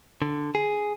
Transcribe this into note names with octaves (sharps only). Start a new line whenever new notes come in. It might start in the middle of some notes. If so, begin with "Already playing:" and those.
D3
G#4